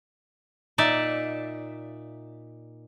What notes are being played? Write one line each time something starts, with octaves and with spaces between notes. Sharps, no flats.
A#2 D#4 D5 E5